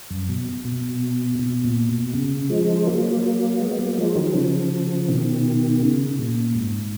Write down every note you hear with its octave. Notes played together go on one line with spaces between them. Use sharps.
F#2
B2
B2
B2
A#2
B2
C#3
F3 G#3
F#3 A#3
G#3 B3
F#3 A#3
F3 G#3
D#3 F#3
C#3 F3
B2 D#3
C#3
A#2
G#2